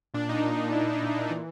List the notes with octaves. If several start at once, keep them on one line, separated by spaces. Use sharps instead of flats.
A#2 D4
A#2 D#4
A#2
A#2
A#2 E4
A#2
A#2
A#2
E3